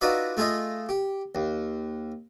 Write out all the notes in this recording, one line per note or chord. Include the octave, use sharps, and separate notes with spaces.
D#4 F4 F#4 B4 D5 E5
A3 F4 G#4 A4 D#5
G4
D#2